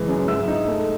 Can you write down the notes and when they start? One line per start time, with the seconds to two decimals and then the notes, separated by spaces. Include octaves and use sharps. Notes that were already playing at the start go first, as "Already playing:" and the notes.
Already playing: F#1 E3 G#3
0.08 F#2
0.28 G#2 E5 E6
0.48 D#4
0.68 A3